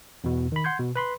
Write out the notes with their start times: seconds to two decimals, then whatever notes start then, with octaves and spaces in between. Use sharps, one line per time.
0.24 E2 B2
0.52 D#3 B5
0.64 F#5 C6 G6 G#6
0.79 B2
0.96 B4 B5 C6